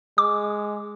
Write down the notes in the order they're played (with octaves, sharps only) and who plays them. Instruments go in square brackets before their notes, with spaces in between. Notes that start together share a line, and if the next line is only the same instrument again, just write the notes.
[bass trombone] G#3 [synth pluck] D6